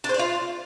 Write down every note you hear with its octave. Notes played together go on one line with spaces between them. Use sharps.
D4
C5
D5
F4